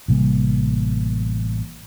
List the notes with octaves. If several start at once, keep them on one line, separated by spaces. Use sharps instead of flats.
A1 C3 G3 A#3